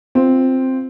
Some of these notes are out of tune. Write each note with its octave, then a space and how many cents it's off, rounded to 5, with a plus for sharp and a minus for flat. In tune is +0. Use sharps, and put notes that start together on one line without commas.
C4 +0 F4 +0